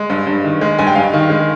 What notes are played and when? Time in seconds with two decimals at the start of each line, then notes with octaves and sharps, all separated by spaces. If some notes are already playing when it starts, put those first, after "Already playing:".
Already playing: G#3
0.10 G2
0.27 G2
0.44 D#3
0.61 G#3
0.79 G2 G#5
0.87 G5
0.95 G2 F5
1.13 D#3
1.30 G#3